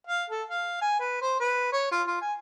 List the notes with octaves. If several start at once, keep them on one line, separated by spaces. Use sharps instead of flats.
F5
A4
F5
G#5
B4
C5
B4
C#5
F4
F4
G#5